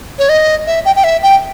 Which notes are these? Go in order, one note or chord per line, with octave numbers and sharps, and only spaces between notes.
C#5
D#5
E5
G5
G5
E5
G5